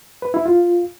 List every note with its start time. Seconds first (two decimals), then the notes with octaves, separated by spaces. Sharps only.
0.22 B4
0.34 E4
0.46 F4